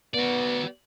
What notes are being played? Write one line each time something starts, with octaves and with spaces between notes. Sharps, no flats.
B3 F#4 D5